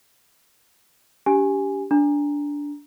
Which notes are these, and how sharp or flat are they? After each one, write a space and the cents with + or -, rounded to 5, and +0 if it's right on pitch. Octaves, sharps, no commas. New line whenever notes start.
D4 -45 G4 -5 G#5 +0
D4 -10 A#5 +0